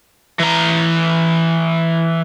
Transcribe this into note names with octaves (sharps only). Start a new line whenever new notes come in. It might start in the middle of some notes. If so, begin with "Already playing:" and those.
E3 A#5